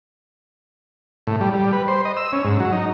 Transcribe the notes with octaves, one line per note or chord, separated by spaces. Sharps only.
A2
G3
G3
B4
C5
D#5
E6
C#4
G#2
F#3
D#4